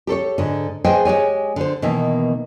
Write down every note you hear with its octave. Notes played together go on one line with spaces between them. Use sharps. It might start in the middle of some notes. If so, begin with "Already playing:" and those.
G4 A4 C5 C#5
G#2 D3
G#4 B4 C5 D#5 G5 G#5
G#3 G4 C#5 G#5
D3 C5
B2 D#3 E3 A#3